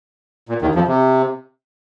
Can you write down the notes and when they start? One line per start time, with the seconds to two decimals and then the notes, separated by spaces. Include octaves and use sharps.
0.49 A#2
0.62 D#2 D#3
0.75 F2 F3
0.87 C3